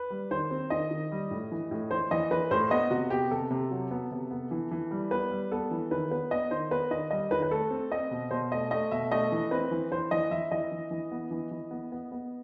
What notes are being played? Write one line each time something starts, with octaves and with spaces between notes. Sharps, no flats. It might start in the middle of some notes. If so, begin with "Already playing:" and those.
Already playing: B4
G3
D#3 C5
C4
D#3 D#5
D#3
G3
A2
E3
A2
E3 C5
E3 D#5
E3 B4
A2 C5
B3 D#5
C3 F#4
B3 G4
C3 A4
C3
F#3
B3
C3
B3
E3
E3
G3
B3 B4
G3
B3 A4
E3
D#3 B4
B3 B4
B3 D#5
D#3 C5
B3 B4
D#3 D#5
G3 D#5
D#3 B4
B4
A3 A4
C4
C4 D#5
B2
B2 C5
A3 D#5
A3 D#5
B2 E5
A3 D#5
E3
C4 B4
E3
E3 C5
E3 D#5
E3 E5
E3 D#5
E3
E3
B3
E3
E3
B3
B3
B3